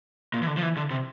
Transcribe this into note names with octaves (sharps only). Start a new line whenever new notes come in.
A#2
E3
D3
F3
E3
D3
C3